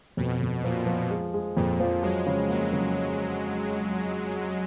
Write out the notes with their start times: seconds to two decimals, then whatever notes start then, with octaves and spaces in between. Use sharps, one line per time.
0.17 F2 B2
0.41 F2
0.63 A#2 F3
0.87 F3
1.11 G#3
1.34 G#3
1.56 F2 A#2
1.80 F3
2.03 F#3 G#3
2.26 C#3
2.49 F#3 A#3
2.73 C#3